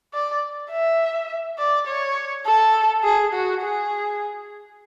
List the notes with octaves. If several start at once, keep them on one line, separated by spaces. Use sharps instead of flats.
D5
E5
D5
C#5
A4
G#4
F#4
G#4